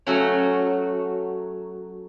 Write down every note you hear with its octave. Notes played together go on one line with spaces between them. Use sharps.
F#3 A3 C#4 F#4 C#5